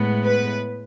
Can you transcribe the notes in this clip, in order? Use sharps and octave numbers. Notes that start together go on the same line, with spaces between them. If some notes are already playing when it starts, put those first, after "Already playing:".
Already playing: A2 G#3 B3
B4